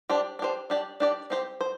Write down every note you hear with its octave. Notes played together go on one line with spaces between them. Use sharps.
D4 G4 C5
D4 G4 C5
D4 G4 D5
D4 G4 D5
C4 G4 C5
C5